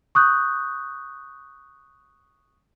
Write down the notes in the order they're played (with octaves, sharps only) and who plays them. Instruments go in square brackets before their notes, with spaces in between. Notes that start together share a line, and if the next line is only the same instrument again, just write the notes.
[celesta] C#6 D#6 F#6 G6